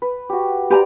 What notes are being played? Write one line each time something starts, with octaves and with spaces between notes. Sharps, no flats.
B4
F#4 G4
G4 B4 C5 D5 G#5 A#5